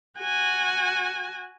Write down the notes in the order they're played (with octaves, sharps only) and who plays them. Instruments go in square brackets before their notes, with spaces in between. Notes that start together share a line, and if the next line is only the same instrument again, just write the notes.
[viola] F#4 G#5